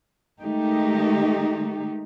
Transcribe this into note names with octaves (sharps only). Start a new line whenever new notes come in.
D#3 G#3 A3 D#4 G4